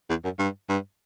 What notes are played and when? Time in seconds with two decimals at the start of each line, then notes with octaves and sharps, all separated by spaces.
0.09 E2
0.24 F#2
0.39 G2
0.69 G2